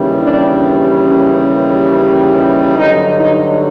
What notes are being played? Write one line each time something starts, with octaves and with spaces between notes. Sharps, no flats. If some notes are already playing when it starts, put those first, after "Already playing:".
Already playing: D#2 C#3 E3 G3
D4
C#4
C#4
G2 D3 F#3 D#4
D#4